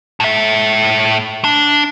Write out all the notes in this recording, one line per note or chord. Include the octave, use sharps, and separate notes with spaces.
A2 E5
D4